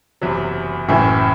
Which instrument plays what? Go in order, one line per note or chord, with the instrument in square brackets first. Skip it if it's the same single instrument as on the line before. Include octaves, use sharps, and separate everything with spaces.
[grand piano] F#1 E2 C3 F#3
[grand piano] F#1 F#2 E3 [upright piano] A2 C#3